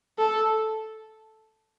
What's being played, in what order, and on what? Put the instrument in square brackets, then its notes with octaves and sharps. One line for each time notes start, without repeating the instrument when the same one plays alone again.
[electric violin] A4